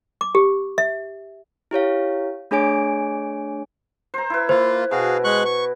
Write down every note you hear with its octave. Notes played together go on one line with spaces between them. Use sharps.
D6
G4
E5
E4 G4 C#5 F5
A3 D4 G#4 C#5 G#5 D7
C5 A#5
E4 B4
A#3 F4 C5
B2 F#4 G#4 F5
G#3 C#6 F#6
C#6